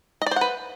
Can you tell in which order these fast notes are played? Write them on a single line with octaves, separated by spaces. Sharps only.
D#5 D5 C5 F#5 B4